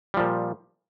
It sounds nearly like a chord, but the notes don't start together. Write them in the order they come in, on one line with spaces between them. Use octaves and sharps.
G3 F3 A#2